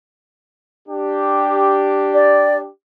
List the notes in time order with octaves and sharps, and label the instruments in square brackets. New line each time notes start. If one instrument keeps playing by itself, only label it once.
[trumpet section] D4 G4
[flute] D5